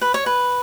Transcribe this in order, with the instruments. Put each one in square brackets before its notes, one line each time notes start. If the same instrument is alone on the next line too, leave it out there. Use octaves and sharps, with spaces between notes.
[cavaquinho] B4
C#5
B4